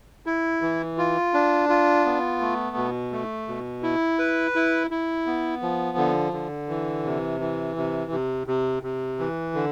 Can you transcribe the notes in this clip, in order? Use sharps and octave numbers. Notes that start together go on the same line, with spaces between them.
E4
E3
F4
D4
F4
B3
A3
B2
A3
B2
E4
B4
E4
E4
B3
F3
D3
D3
E3
C3
E3
C3
C3
C3
C3
E3
D3